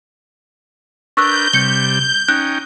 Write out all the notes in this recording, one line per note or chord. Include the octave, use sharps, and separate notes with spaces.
D4 A#4 B4 C#6 E6 F#6 G6
C3 G3 C#7 G7
C#4 D#4 G5 F#6